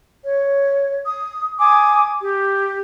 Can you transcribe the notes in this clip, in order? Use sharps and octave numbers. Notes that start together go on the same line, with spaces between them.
C#5
D#6
G#5 D6 D#6
G4